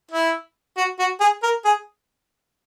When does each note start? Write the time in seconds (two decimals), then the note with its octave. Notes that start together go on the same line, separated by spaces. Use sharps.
0.11 E4
0.77 F#4
0.99 F#4
1.20 G#4
1.43 A#4
1.65 G#4